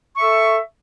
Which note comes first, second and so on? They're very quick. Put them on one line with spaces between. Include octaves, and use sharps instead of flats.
C#6 E5 A4